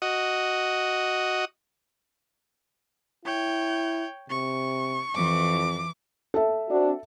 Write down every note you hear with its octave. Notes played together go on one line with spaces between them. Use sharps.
F#4 D#5
E4 C#5 G5
C3 C#6
F2 E3 D6
A4 E5
C4 D4 F#4